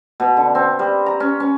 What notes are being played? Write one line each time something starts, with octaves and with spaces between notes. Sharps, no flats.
B2
D3
C4
G3
A#5
C#4
C#4